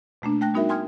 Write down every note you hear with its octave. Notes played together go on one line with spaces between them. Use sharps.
B2 A3 A#3 D4
A3 G5 F#6 A#6
G3 B3 D#4 F#4 A#4 E5
G5 G#5 C6 D#6 F6 G#6